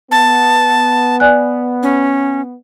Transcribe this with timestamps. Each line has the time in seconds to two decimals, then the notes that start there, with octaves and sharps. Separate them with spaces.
0.11 B3 A5
1.20 D5 G#5 F#6
1.83 C#4